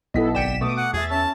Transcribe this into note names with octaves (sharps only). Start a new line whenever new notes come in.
B1 B3 E4 A4 D#5 B6
G#1 D5 G5 B6 C#7 E7
B2 A3 D6 D#6
F#5
E2 G#4 E5 A6
C#4 A5